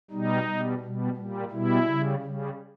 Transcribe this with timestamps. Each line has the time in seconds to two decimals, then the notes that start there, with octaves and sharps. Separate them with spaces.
0.11 B2 G3 D#4
0.46 B2 G3
0.81 B2 G3
1.16 A#2 G3
1.51 B2 G3 E4
1.87 C#3 G3
2.22 C#3 G3